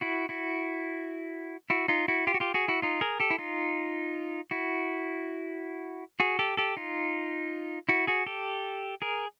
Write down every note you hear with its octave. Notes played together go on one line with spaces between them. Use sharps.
E4 F#4
E4 F#4
E4 F#4
D#4 F4
E4 F#4
F4 G4
F#4
F4 G4
F#4 G#4
E4 F#4
D#4 F4
G#4 A#4
G4 A4
E4
D#4 F4
E4 F#4
F#4 G#4
G4 A4
G4 A4
D#4 F4
E4 F#4
F#4 G#4
G4 A4
G#4 A#4